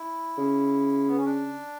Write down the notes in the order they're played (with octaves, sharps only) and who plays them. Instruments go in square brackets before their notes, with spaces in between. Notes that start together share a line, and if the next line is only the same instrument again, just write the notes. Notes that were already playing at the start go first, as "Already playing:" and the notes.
Already playing: [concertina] E4
[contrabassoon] C#3
[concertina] B3
C#4
D4